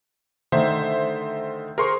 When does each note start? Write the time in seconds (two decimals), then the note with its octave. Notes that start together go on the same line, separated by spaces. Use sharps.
0.52 D3 D#3 A3 C5 E5
1.78 G#4 A#4 C5 C6 C#6